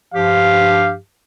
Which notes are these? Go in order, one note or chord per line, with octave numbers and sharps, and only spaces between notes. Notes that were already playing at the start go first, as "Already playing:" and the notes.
G2 F3 G4 F5